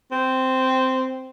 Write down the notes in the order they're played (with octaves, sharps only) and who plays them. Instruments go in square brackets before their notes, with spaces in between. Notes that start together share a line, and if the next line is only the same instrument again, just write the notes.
[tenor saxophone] C4